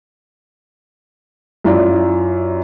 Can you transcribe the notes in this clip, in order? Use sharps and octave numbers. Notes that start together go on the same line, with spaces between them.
F#2 E4 F4 D5